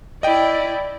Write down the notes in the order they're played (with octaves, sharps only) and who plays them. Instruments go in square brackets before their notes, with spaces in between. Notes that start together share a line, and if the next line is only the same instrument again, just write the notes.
[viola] E4 D5 [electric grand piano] D#5 G5